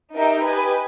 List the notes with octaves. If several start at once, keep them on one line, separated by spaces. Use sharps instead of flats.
D#4 G4 A#4 E5 G5
G4 B4 D#5 G#5